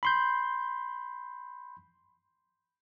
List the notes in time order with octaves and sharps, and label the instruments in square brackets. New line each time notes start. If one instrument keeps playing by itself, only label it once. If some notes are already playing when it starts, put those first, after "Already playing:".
[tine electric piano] B5 C6 G6